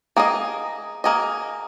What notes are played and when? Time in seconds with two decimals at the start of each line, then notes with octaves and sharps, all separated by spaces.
0.16 A#3 G#4 D#5
1.04 A#3 G#4 D#5